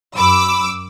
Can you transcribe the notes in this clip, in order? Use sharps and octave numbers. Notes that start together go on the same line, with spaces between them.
F#2 B5 D6 E6